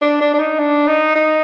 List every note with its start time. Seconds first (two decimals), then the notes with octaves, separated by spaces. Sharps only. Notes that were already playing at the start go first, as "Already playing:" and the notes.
0.02 D4
0.21 D4
0.34 D4
0.40 D#4
0.59 D4
0.88 D#4
1.16 D#4